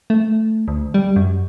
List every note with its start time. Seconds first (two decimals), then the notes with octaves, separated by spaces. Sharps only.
0.10 A3
0.68 D2
0.94 G3
1.16 F#2